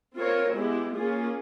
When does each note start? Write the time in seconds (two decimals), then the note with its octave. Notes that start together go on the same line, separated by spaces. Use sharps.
0.17 C4 F4 A#4 C#5
0.55 G#3 B3 E4 G4
0.94 A#3 C#4 F4 G#4